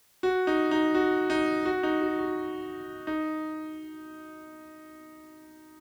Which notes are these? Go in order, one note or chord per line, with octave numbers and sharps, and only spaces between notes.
F#4
D#4
D#4
F#4
D#4
F#4
D#4
F#4
F#4
D#4